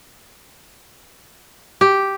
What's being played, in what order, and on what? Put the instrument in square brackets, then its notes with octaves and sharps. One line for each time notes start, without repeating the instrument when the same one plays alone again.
[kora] G4